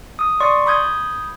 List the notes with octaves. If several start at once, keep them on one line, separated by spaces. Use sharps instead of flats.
D#6
D5 C6 C#6
B5 D#6 G6 G#6